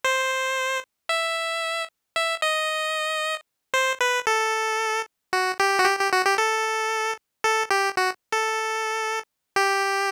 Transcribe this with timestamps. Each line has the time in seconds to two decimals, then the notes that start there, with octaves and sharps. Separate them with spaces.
0.05 C5
1.09 E5
2.16 E5
2.42 D#5
3.74 C5
4.01 B4
4.27 A4
5.33 F#4
5.60 G4
5.79 F#4
5.85 G4
5.99 G4
6.13 F#4
6.26 G4
6.38 A4
7.44 A4
7.71 G4
7.97 F#4
8.32 A4
9.56 G4